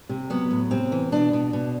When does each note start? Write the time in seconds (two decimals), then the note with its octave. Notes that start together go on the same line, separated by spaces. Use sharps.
0.09 C3
0.30 F#3 B3
0.51 A2
0.71 C3 C4
0.92 E3
1.12 B2 D4
1.33 B2
1.53 B2